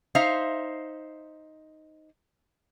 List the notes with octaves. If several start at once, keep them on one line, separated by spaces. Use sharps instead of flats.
D#4 C5 E5 F5